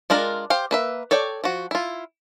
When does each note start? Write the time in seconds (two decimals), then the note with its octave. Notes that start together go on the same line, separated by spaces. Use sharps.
0.10 G#3 D4 F4 A#4
0.50 G4 C5 F5
0.71 A#3 B4 E5
1.11 A4 C#5 D5 G5
1.44 F3 F#4
1.71 E4 F4